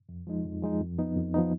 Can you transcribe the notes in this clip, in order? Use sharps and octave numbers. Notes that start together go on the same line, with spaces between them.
F2
F3 G#3 D#4
F2
F3 G#3 D#4
F2
F3 B3 D#4
F2
F3 B3 D#4